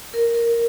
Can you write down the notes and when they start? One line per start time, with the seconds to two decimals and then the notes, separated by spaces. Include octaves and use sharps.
0.14 A#4
0.34 A#4